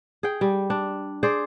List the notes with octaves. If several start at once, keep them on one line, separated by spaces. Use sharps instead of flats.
G#4 G5
G3
D4
G#4 C5 D5